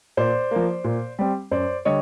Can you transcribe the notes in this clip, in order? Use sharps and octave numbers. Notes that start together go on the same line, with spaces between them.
A#2 C5 D5
F3 A#3
A#2
G3 C4
F#2 C5 D5
D3 G3 C#5 D#5